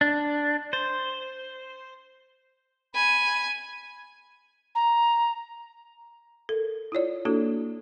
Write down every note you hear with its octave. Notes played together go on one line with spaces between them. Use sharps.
D4
C5
G#5 B5
A#5
A4 A#4
E4 F4 C#5 D5
A#3 D4 E4 F#4 A4